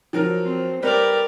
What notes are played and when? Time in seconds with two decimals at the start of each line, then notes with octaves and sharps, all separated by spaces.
0.13 F3 F#3 A#4
0.44 C4
0.82 G3 G4 A#4 B4 D5